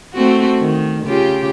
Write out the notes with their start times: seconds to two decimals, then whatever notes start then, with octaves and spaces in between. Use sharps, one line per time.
0.13 A3 C4 F#4
0.60 D#3
1.05 C#3 F4 G4